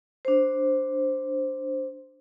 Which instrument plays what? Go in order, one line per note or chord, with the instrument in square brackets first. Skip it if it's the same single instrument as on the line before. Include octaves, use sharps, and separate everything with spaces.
[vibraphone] D4 C5